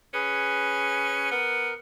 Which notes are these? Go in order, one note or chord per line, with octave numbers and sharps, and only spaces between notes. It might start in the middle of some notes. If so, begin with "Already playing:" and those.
C#4 G#4 B4
B3 A#4